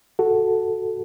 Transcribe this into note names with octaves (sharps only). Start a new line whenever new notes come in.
F#4 A4